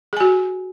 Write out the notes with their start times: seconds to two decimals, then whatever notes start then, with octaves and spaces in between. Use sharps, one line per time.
0.13 G#4
0.17 G#5
0.20 F#4